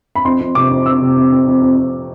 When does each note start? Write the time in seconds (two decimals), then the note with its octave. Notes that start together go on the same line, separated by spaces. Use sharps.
0.16 B5
0.25 F2 C6
0.40 F2
0.55 C3 D6
0.71 F2
0.86 F2 E6
1.02 C3
1.17 F2
1.32 F2
1.48 F2
1.62 F2
1.78 F2